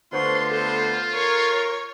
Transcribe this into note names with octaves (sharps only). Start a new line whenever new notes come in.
D3 A3 B3 F4 B4 C5 C6 C#6
A4 C5
A#4 C#5